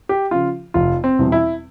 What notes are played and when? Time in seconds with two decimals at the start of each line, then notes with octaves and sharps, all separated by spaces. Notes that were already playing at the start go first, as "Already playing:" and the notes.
0.09 G4
0.31 C#3 F3 F4
0.74 F1 F4
1.04 C4
1.19 E2 B2 G3
1.32 E4